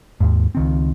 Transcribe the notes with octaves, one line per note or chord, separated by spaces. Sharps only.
D#2 G#2
C#2 D#3 C4